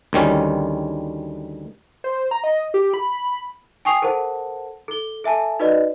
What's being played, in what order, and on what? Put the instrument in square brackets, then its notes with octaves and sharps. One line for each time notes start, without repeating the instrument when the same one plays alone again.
[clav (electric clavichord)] D2 D#3 G3 C#4
[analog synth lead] C5
A#5
D#5
G4
B5
[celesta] G5 G#5 C#6 D#6 C7 F7
A4 A#4 C5 F#5 A5
A4 G7
A4 E5 G#5 A5
D#4 F#4 B4 D5 D#5